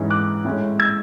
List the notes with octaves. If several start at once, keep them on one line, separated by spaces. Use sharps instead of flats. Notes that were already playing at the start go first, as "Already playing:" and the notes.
Already playing: G#2 E3 G#3 C#4
D6 F#6
A2 G#3 C#4
E6 G#6